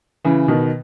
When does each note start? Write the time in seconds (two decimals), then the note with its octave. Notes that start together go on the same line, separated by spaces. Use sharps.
0.25 C#3 E3
0.48 B2 D#3